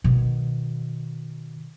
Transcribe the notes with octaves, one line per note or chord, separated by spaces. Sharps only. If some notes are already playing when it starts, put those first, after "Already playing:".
B2 D#3